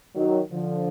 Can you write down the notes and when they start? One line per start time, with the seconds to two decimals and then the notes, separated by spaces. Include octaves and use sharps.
0.14 D#3 F#3
0.50 D3 F3